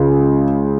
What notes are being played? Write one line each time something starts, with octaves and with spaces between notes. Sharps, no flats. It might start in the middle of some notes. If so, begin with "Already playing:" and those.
Already playing: C#2 C#3